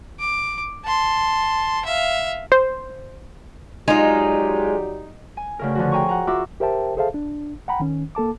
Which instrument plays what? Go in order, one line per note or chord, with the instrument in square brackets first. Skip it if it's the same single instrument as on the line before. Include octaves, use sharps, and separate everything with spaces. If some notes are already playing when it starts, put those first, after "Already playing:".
[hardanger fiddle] D6
A5 C6
E5 F5
[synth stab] C5
[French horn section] F#3 G4 D5 [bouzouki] G#3 F4 [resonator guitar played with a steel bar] D#4
[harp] G#5
D2 C#3 A#4
D3 F3 F#4
G#4 G5 G#5 A#5 C#6
F#5 A#5
F4 F#4 E5 D6 E6
[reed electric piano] G4 A#4 C5 E5 G5 A5
G#4 A4 C5 E5 F5 A5
D4
F#5 G5 A#5 B5
D#3 C#4
A#3 A4 A5 D6